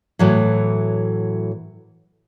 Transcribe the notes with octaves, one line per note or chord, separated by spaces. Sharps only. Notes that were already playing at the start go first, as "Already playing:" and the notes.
A2 E3 F#3